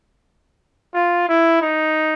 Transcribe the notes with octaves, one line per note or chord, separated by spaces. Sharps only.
F4
E4
D#4